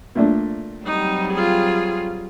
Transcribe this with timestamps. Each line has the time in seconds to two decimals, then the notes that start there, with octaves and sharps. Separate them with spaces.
0.15 A#2 A3 D4
0.86 F#3 G3 C4 D#4
1.33 F4 G#4